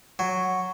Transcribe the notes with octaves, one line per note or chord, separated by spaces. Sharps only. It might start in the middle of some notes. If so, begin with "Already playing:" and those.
F#3